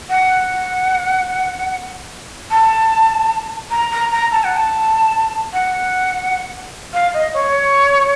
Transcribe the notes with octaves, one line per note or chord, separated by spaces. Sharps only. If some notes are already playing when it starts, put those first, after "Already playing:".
F#5
A5
A#5
A#5
A#5
A5
F#5
A5
F#5
F5
D#5
C#5